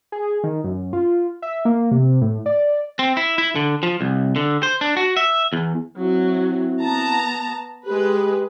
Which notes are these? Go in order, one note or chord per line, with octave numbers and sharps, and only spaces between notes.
G#4
D#3
F#2
F4
E5
A#3
C3
A2
D5
C4
E4
E4
D3
F3
C2
D3
C5
D4
F#4
E5
E2
F#3 C4 E4
B3 A5 A#5
G#3 G4 B4